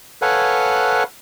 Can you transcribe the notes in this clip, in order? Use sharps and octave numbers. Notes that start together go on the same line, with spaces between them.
A4 B4 C#5 F5 F#5 G#5